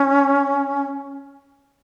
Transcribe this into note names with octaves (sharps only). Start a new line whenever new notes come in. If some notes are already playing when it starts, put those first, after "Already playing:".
Already playing: C#4